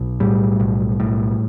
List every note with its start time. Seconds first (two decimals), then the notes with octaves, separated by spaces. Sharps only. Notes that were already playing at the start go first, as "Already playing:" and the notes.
Already playing: B1
0.20 A2 G3
0.60 B1
1.00 A2